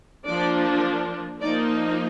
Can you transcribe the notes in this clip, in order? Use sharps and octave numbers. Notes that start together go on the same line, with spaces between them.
F3 A#3 D4 D5
F3 A#3 D#4 D5